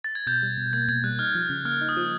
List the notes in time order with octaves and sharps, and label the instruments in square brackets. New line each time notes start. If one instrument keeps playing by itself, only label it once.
[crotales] A6
G#6
[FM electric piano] B2 [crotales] G6
[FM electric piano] G3
B2
[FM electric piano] A#3 [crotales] G#6
[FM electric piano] B2 [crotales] G#6
[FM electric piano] G3 [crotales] F#6
[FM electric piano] D#4 [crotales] F6
[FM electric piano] F3
C#3
[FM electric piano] A#3 [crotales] F6
[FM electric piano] D#4
[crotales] D#6
[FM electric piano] F3